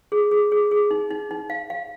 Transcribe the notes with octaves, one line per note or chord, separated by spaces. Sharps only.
G#4
G#4
G#4
G#4
D#4
D#4
D#4
F5
F5